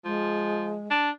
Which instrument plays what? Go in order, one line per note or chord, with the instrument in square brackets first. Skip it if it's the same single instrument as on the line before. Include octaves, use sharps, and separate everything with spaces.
[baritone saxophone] F3 [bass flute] G#3
[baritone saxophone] D4